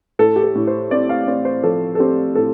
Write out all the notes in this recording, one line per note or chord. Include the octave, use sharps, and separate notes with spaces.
A2 A4
G4
A4
A2
C5
C4 D5
F5
C4 D5
C5
F3 A4
A4
C4 G4
A2 A4